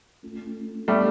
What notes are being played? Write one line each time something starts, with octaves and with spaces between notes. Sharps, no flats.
A3 C#4 F4 A4
G3 A3 B3 D4 G4